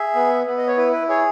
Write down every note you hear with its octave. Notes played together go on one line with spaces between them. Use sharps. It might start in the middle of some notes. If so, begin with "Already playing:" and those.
Already playing: G#4 E5
B3
B3
D#5
C#5
E4 B4
B4
G#4 C#5